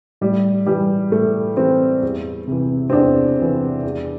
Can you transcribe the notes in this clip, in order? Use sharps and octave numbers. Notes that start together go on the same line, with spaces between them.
A2 G3
E3 G3
A2 A3
E3 C4
E2
C3 E3
C4
E2 D4
C3 E3
E2